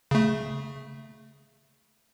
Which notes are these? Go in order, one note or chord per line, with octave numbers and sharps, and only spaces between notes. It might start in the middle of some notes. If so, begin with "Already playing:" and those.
C#3 A3